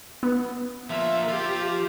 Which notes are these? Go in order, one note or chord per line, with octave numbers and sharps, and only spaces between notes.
B3
F3 A#3 E5
F3 F4 G4